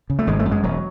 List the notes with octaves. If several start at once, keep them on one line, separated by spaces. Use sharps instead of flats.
C#3
A3
G#1 G#3
A3
F#2
G#3
E1 F#3